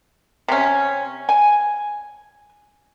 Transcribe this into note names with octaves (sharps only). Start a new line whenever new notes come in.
C3 C#4
G#5